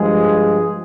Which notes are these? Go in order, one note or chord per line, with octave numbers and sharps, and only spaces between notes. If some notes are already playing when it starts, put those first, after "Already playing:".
Already playing: G2 F3 G#3 G#4